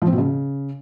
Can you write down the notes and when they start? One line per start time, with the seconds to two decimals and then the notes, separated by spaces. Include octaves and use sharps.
0.02 F3
0.07 C4
0.13 B2
0.18 C#3